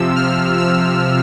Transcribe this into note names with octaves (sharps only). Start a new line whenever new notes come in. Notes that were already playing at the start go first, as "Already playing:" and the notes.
Already playing: C3 F3 E6
F6
E6